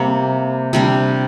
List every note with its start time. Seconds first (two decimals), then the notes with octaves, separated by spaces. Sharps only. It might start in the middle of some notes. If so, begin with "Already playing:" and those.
Already playing: C3 G3 A#3
0.73 C3 G3 D4